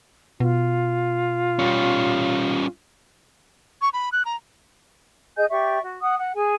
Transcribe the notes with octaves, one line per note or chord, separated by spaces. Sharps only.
B2 F4
G3 C#4
C#6
B5
F#6
A#5
G#4 D#5 G#5 G6
G4 D5 E5 C#6
F#4
F#5 D#6
F#5
G#4 G#5